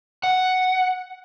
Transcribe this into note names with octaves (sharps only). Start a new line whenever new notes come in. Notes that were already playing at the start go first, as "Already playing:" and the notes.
F#5